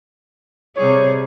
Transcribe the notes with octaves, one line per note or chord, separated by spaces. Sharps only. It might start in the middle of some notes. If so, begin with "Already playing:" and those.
C3 G3 G#4 C#5